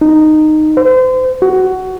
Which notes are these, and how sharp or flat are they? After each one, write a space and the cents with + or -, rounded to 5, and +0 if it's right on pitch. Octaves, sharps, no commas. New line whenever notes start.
D#4 -10
C5 -35
F#4 +15